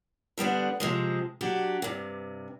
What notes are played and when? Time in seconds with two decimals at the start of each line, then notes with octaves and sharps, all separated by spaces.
0.38 D3 G3 B3 D4
0.80 C3 F3 G#3
1.41 F#3 D4 G4
1.82 G2 C3